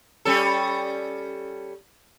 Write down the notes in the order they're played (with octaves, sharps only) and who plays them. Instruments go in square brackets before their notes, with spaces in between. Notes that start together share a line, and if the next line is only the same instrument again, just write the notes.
[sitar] G3 C#4 A4